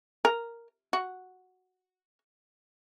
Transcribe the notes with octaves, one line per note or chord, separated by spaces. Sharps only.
A#4
F#4